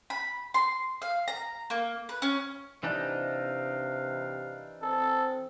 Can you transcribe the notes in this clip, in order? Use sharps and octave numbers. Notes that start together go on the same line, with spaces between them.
B5
C6
F5
A#5
A#3
B4
C#4
C3 E3 D4 D#4 F5
C4 A4